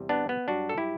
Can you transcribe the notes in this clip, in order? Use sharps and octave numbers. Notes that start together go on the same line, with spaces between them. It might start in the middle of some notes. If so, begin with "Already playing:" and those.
Already playing: E2 C3 G3
B3 D4
B3
G2 F#3 D4 F#4
A4
E4 G4